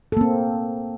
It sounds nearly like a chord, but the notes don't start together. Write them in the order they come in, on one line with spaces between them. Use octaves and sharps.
A4 A#3 C4